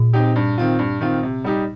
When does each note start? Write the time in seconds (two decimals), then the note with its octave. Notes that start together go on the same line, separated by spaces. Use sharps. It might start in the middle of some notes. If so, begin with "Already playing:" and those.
Already playing: A#2
0.13 C4 D#4 G4
0.36 G2
0.58 D#3 C4 F4
0.79 G2
1.01 D#3 C4 F4
1.23 C3
1.44 G3 D#4 G4